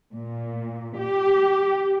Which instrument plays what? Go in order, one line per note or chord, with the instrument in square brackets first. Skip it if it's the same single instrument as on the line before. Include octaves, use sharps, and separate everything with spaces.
[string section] A#2
G4